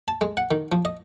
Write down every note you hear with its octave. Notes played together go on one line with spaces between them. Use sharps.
A5
G#3
F#5
D#3
F3
D#5